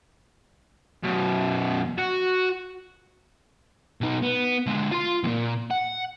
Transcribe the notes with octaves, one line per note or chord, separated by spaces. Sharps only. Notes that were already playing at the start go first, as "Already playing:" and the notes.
F#2 B2
F#4
B2 D#4
B3
D3 G#3
F4 C6
E2 A#2
F#5